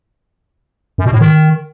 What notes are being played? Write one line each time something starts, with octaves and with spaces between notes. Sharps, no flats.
F#2
B2
A2
D#3